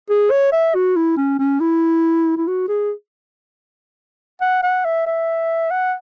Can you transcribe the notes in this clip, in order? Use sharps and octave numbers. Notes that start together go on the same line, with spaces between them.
G#4
C#5
E5
F#4
E4
C#4
C#4
E4
E4
F#4
G#4
F#5
F#5
E5
E5
F#5